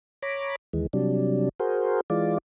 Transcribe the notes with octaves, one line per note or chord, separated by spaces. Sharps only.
C#5 A#5 B5 D6
D#2 E3 G#3
C3 F#3 G3 D4
F#4 G#4 A#4 C5
E3 G#3 F4 D5